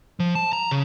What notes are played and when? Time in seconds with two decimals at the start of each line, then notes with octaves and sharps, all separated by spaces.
0.20 F3
0.35 A5
0.53 A#5
0.71 C#3